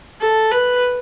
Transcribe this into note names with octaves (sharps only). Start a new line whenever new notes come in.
A4
B4